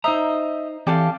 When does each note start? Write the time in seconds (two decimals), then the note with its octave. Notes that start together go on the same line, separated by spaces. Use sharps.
0.04 D#4 C5 D#5 E5 A#5
0.87 E3 C4 G4 A4 D5 F5